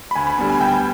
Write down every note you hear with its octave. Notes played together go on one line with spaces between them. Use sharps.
B5
D2 G#5
B5
D3 G3 B3 B5
G#5
D2 G5